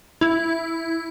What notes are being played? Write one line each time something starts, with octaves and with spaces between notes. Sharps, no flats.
E4